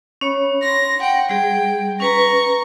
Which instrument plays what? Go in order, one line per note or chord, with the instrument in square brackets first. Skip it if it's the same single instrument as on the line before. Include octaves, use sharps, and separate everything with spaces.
[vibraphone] C#4 C#5 B5
[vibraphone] C6 [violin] A#6
[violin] F#5 G5
[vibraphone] G3 G#4 [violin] G5
[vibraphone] C#4 B4 A#5 [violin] C#6 A#6